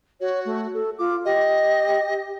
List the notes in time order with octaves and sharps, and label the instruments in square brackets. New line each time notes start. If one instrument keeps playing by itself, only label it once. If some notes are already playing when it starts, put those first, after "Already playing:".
[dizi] F#4 [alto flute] C#5
[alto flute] A3
A4
[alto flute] F4 [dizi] D6
[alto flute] G4 [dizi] D#5